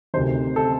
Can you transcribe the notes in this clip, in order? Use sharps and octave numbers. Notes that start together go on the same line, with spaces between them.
D2 C3 D#3 C5
A4